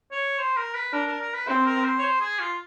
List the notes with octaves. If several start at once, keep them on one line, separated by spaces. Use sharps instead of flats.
C#5
C5
A#4
B4
D4 A#4
A#4
A#4
B4
C4 C5
A#4
C5
C#5
C5
G#4
F4